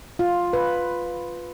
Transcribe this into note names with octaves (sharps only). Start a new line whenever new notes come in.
F4
B4